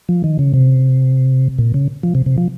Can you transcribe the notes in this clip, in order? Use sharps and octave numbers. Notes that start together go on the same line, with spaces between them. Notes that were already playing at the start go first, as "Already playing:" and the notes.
F3
D#3
C#3
C3
A#2
C#3
F3
C3
C3
F3